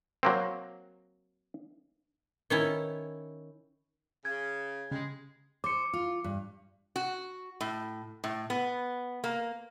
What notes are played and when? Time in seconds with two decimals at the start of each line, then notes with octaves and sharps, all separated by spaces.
0.23 F#3 A#3 C4
2.50 D#3 C#4 E4
4.25 C#3 G#6
4.91 C#3 G3 G#3
5.64 C5 D6 C#7
5.93 F4
6.24 G2
6.96 F#4
7.61 A2
8.24 A2
8.50 B3
9.24 A#3